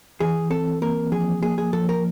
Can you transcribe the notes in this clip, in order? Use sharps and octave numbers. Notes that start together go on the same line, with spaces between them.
E3 G#4
C4 A4
A#3 A#4
F3 G#4
A#3 G#4
G#4
F3 A4
A#4